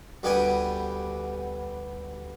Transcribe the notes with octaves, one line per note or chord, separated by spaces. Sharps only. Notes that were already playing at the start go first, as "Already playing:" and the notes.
D2 G3 B3 G4 G#5